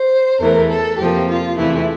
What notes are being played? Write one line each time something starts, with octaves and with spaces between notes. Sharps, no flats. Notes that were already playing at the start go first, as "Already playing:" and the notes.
Already playing: C5
E2 E3 A3 A#4
A4
F2 C3 F3 A#3 G4
F4
E2 C3 E3 A3 E4